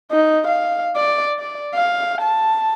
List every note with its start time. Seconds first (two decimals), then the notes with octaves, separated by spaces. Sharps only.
0.11 D#4
0.48 F5
0.96 D5
1.40 D5
1.75 F5
2.21 A5